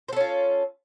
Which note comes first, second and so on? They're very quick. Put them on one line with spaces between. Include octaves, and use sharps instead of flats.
C5 A4 C#4 F4